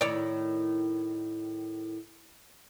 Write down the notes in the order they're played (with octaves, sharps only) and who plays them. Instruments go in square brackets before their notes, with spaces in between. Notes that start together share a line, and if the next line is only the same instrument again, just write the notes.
[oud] A2 D#3 E4 [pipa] C#5 D5